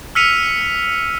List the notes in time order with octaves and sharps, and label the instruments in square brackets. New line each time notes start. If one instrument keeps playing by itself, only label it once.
[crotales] E6 F6 B6 C#7 D#7 F7